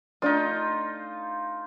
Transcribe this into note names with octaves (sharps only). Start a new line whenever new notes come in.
A3 D4 D#4 F4